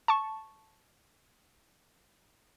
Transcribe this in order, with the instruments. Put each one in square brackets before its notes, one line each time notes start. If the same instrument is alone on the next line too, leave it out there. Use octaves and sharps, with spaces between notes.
[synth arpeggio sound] A5 C#6